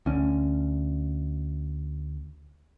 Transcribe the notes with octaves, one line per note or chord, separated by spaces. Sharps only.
D2 C#4